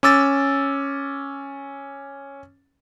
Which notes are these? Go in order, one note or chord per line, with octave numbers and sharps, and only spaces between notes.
C#4 D6 E6 A6